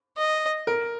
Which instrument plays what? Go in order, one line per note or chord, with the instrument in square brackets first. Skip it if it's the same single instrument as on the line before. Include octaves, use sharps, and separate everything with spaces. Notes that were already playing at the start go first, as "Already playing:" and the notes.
[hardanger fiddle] D#5
[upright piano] A#4